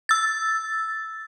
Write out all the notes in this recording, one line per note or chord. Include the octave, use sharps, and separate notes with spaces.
E6 A6